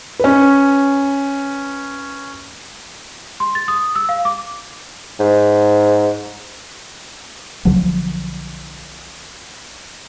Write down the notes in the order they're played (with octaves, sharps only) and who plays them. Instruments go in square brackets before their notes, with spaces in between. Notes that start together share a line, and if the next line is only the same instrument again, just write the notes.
[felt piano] C#4 B4
[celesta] C6
A6
D#6
E6
F5
D6
[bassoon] G#2
[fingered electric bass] B1 D3 F3 F#3